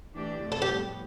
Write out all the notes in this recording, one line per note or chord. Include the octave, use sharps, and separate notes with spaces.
E3 A3 D4 G4 D5
F2 C3 F3 A3
A4
G4
A2 G3 B3